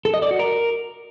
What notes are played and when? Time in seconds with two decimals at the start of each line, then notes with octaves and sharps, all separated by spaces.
0.05 A4
0.14 D#5
0.22 D5
0.31 F#4
0.39 A#4